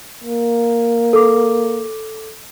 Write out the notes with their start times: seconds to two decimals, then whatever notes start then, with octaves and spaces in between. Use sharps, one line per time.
0.24 A#3
1.13 A4 D6